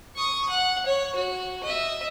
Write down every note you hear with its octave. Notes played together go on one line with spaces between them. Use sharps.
C#6 D#6
F#5
C#5
F#4
D#5 E5